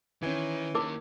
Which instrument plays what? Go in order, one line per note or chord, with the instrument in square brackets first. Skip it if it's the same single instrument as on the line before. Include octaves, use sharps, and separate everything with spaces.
[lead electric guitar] D#3 [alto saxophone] E3 [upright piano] C#4 G#6
[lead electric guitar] D#3 A#3 [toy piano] E4 A#4 D6